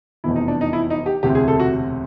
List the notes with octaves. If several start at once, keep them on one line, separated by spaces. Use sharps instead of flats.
F1 E2 B2 E4
D#4
D4
D#4
E4
D#4
G4
E1 D2 C3 G4
G#4
A4
F#4